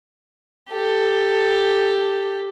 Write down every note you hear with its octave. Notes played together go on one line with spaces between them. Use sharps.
G4 A4